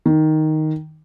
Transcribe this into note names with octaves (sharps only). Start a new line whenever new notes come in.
D#3